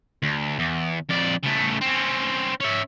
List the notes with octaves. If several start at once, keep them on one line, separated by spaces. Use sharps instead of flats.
D2
E2
F2 D5
C#3 A3
C4 C#4
C#4 E5